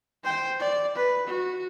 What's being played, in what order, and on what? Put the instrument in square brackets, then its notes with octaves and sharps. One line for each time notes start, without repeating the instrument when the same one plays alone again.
[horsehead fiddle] C5 G5
D5
B4
F#4